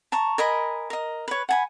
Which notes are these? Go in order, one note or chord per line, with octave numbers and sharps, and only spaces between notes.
A5 A#5 C#6
A#4 D#5 G#5 B5
A#4 D#5
B4 C#5
F#5 G#5 B5